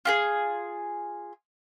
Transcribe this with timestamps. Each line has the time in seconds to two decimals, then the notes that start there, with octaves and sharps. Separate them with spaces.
0.05 F4 G4 G#4